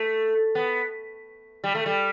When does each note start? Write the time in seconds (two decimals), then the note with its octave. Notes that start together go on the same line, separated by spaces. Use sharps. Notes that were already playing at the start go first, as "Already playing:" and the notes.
Already playing: A3
0.55 B3
1.64 G3
1.75 A3
1.86 G3